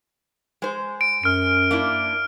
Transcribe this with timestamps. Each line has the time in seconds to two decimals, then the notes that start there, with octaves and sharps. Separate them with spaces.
0.62 G#3 C5
1.01 D7
1.24 F#2 F6 D7
1.71 A#3 D4 E4